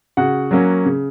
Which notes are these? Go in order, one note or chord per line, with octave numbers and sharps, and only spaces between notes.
C#3 F#4 F#5
F#3 A#3 C#4
C#3